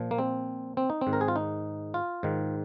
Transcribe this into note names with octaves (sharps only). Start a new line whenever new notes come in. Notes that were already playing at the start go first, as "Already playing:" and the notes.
Already playing: A#2 F3
A#3
C4
C4
D#4
C4
G#2 D#3
A#4
G#4
F4
D#4
F4
G#2 D#3